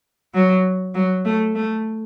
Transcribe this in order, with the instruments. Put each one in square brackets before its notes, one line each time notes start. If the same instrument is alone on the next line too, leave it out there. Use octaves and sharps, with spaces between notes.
[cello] F#3
F#3
A3
A3